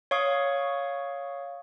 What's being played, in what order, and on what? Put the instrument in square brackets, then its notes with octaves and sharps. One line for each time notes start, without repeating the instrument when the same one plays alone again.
[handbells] C#5 F5 C#6 D#6